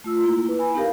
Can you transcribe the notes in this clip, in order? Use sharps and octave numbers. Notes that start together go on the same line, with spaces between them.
A3 F4 E6
A#3 E4
E4 B4
G#5 B5
B3 D#4 E4 G4 A#4 F5